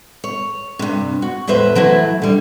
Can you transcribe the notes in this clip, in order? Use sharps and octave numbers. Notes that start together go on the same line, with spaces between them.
C#5
G2 C3
F#4
E2 A2 B4 C5 E5
E3 F#3 A3 E4
D3 G3